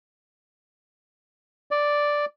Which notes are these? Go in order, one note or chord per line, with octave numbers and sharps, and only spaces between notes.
D5